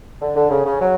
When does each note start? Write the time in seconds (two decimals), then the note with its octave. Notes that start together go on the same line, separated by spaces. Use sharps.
0.20 D3
0.35 D3
0.50 C#3
0.65 C#3
0.80 F#3